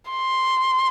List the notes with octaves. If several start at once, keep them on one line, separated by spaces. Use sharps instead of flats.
C6